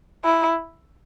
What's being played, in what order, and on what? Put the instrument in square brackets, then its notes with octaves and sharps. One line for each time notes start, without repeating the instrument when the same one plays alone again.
[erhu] E4